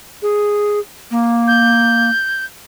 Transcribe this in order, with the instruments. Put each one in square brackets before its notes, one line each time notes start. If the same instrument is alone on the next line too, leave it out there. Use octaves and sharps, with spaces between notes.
[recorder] G#4
A#3
[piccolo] G6